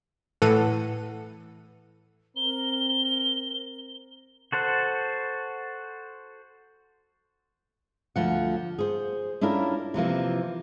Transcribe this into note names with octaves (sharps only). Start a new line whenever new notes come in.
A2 E3 A4 F#5 D#7
C4 A#4 G7
F#4 A4 C5 F#5
D2 F3 F#5
G#4 C5
C#4 D4 E4 F4 A#4
C3 E3 F3 A#3